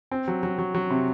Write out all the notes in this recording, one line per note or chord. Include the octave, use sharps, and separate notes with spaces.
C4
F#3
F#3
F#3
F#3
C3